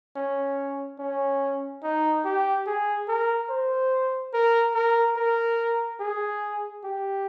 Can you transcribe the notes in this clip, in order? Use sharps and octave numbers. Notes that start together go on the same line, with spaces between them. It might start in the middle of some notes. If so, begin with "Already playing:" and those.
C#4
C#4
D#4
G4
G#4
A#4
C5
A#4
A#4
A#4
G#4
G4